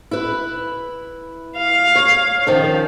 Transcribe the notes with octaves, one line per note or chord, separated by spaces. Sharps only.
E4 B4
F5
C#5
D#3 F3 C#4